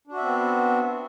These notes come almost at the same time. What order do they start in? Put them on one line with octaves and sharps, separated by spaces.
D4 F#4 E5 C4 B3